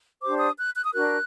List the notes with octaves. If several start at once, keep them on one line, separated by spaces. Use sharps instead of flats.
D4 G4 C5 D6
D#6
F#6
F#6
D#6
D4 F#4 A#4 F#6